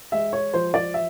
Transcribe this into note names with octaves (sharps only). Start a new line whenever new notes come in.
G#3 E5
C#5
F3 C5
D5
E5